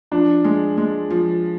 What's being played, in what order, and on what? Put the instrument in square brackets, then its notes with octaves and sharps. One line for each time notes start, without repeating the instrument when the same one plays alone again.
[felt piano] F3 [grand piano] D4
[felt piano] G#3
G#3
F3